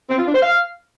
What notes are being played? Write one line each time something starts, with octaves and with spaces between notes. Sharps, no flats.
C4
F4
D4
C5
F5